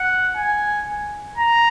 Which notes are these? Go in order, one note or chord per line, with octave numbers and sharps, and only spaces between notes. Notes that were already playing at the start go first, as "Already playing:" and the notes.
Already playing: F#5
G#5
A#5